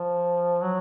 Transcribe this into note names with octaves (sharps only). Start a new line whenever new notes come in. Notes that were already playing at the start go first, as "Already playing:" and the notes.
Already playing: F3
F#3